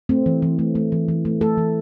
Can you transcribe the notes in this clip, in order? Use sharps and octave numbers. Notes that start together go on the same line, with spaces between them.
A3 C4
E3
E3
A3
A3
E3
E3
A3
A3 A4
E3